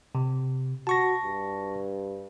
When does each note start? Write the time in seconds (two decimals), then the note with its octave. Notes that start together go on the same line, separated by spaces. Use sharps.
0.15 C3
0.87 F#4 A5 C#6 A#6
1.24 G2